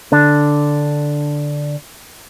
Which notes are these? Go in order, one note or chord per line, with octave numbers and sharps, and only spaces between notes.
D3 D4